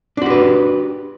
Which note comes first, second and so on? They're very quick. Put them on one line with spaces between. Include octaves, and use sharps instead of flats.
D4 F#4 G4 B4